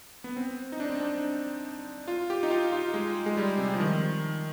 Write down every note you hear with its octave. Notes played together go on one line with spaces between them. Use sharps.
B3
C4
D#4
D4
C4
D4
F4
G4
D#4
F4
F4
G#3
G#3
G3
C3
F3
D#3